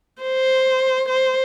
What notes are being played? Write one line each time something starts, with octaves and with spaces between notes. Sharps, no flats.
C5
C5